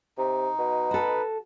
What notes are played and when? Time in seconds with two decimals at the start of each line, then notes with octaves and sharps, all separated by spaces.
0.18 C3 D#4
0.58 B2
0.91 F#4 A4 B4